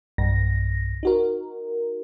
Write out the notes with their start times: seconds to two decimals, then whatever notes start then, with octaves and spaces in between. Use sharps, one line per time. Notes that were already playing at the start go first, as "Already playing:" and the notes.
0.18 B1 G2 A#6
1.03 D#4 F#4 A#4